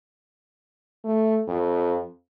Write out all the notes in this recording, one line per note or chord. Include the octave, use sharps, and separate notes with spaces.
A3
F2